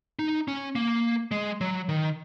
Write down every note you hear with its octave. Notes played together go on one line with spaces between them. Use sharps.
D#4
C#4
A#3
G#3
F#3
D#3